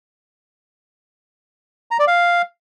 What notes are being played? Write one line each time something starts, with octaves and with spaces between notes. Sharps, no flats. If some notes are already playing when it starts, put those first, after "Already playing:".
A#5
D5
F5